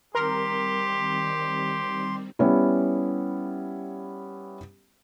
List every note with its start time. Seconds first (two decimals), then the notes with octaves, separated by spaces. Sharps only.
0.15 D#3 G3 C4 G4 A#4 C6
2.39 G3 B3 C#4 E4